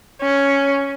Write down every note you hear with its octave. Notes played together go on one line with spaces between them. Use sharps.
C#4